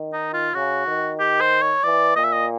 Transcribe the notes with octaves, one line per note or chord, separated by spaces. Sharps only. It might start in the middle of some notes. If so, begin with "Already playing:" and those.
Already playing: D#3
D#4
F4
C#3 F#4
D#3
G4
C5
C#5
E3 D5
A#2 D#5
E5
D#5